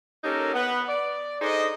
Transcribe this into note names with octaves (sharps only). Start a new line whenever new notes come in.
A#3 C#4 D#4 G4 A4 A#4
B3 B4
D5
D4 D#4 G#4 A4 C5 D#5